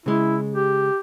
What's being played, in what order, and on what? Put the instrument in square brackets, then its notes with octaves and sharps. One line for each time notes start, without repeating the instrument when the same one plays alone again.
[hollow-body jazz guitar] C#3 G#3 [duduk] E4
[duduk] G4